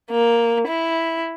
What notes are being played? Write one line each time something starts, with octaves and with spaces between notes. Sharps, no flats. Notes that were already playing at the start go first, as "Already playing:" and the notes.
A#3
E4